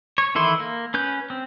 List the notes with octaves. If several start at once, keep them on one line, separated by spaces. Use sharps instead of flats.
C#5
D#3 E3 E4 A4 C6
A#3
C#4 B4 G6
C4